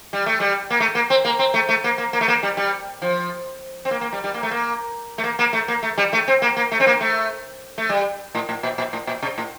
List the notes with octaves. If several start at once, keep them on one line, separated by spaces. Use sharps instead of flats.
G3
A3
G3
A#3
A3
A#3
C4
A#3
C4
A3
A3
A#3
A#3
A#3
A3
A#3
G3
G3
F3
C4
A#3
A#3
G3
G3
A#3
A3
A#3
A3
A#3
A#3
A3
A#3
A3
G3
A3
C4
A#3
A#3
A3
C4
A#3
A3
A3
G3
A2
A2
A#2
A#2
A2
A#2
C3
A2